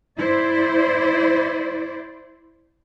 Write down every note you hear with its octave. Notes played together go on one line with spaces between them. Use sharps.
E4 C5 D5